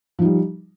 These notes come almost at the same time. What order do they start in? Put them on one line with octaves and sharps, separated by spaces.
F3 D#4 G3